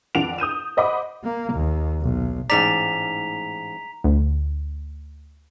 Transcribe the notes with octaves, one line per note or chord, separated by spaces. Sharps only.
F2 D4 F#5 D7 F7
D#6 G6 D#7 E7
C5 D#5 F#5 B5 D6
A#3
D#2
B1
A1 G#2 D5 A#5 B6 F7
D2